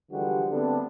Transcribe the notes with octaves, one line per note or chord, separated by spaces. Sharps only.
D3 E3 F3 G3 G#3 F#4
D3 A3 B3 C4 D4